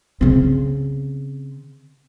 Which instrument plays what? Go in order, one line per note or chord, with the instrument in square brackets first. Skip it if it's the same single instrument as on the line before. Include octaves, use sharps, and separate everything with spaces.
[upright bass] C#3 C4